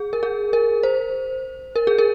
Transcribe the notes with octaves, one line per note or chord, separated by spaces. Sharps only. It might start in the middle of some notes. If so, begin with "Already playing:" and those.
Already playing: G#4
A#4
G#4
A#4
C5
A#4
G#4
A#4